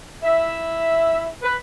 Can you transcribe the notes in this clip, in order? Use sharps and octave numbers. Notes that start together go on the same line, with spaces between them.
E4 E5
B4